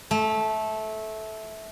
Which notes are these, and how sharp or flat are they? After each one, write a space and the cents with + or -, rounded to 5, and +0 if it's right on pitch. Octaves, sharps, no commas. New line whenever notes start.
A3 -15